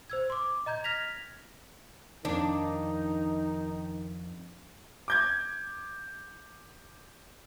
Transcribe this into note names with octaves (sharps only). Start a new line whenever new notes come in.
C5 E6 G#6
C6 D6
D#5 A#5 G6 G#6
F6 G#6 A#6 B6 F7
F2 D#3 D4 D#4
D6 G6 G#6